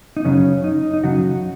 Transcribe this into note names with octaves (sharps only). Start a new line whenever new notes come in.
D#4
F#2 C#3 F#3 C#4
D#4
D#4
F#2 C#3 F#3 F#4